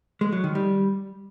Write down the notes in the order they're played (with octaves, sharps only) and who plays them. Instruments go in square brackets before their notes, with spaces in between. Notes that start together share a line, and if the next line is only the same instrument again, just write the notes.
[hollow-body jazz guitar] G#3
F#3
D#3
G3